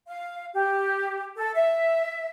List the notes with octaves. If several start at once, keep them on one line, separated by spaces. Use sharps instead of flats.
F5
G4
A4
E5